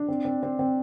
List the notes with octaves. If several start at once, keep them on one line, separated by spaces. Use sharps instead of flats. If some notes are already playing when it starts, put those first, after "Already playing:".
Already playing: D4
C4
C4
C4
C4